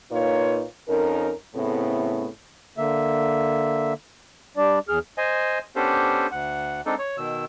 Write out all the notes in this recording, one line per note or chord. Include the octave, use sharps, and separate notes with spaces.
A#2 A#3 D#4 F4 B4 C#5
F2 C#4 D#4 A#4
A2 C#3 A3 B3 C4 E4
D3 A#3 E5
G3 D4 D5
E2 G#4 F6
C5 D#5 G#5
B3 C#4 D4 G4 A4 C5
D2 F#5
G#3 C4 D4 D#4 A4
C#5
B2 D#3 E6